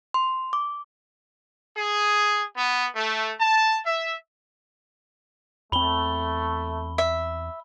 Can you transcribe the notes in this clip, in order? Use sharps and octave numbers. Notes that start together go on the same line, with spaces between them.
C6
D6
G#4
B3
A3
A5
E5
E2 A3 C4 B5 G7
E5